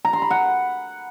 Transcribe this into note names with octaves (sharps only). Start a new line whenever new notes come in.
A#5
C6
B5
F#5